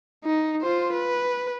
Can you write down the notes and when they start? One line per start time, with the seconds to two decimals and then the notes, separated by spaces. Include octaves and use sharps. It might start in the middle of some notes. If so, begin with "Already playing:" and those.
0.25 D#4
0.62 F4 C5
0.93 B4